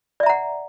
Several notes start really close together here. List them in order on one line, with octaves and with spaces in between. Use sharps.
D5 E5 A#5 F#5